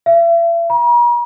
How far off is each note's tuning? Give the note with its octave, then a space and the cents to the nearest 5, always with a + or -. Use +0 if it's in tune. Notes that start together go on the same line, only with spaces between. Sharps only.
E5 +40
A#5 +45